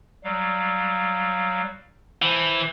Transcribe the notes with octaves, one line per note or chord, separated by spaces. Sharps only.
F#3 G3 F5
E3 C5 A5